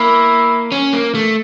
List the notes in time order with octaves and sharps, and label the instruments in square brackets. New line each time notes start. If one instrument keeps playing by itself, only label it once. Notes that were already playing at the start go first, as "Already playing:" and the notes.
Already playing: [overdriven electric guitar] A#3 [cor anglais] E4
[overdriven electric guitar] C#4
A#3
A3